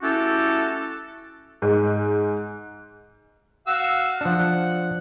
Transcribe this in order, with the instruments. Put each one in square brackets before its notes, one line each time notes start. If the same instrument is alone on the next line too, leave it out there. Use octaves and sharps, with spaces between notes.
[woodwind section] A3 C#4 E4 F#4 G4 A4
[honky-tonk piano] G#2
[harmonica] F#4 F5 E6
[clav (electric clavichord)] F3 D4 [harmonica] F#5